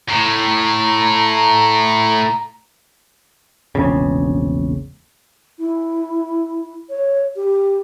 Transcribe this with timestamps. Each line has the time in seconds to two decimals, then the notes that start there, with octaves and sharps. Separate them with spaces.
0.09 A2 A#5
3.75 E1 A#1 C#3
5.58 E4
6.89 C#5
7.36 G4